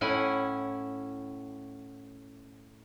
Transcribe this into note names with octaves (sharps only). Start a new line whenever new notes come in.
A2 C#4 E4 F#5 G#5